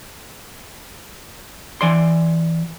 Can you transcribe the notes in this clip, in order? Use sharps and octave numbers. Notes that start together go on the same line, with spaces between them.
E3 D5 C6